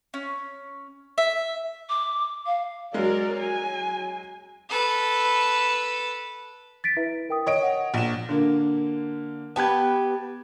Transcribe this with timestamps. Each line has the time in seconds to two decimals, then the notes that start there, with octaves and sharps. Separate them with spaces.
0.14 C#4
1.18 E5
1.89 D6
2.46 F5
2.94 F#3 G#3 A#4 D5
3.40 G#5
4.70 A4 B4
6.84 A6 B6 D7
6.97 E4 B4 E5
7.29 A#4 G5 D#6
7.47 C#5 D#5 D7
7.63 F#5
7.94 A#1 E7
8.29 D3 A#3
9.56 B3 G4 B4 A5 G#6